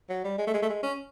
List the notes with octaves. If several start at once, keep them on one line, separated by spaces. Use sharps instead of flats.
F#3
G3
G#3
A3
G#3
A3
G#3
C#4